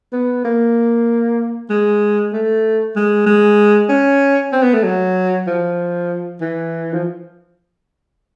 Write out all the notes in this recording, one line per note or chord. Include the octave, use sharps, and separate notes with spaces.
B3
A#3
G#3
A3
G#3
G#3
C#4
C4
B3
A3
F#3
F3
E3
F3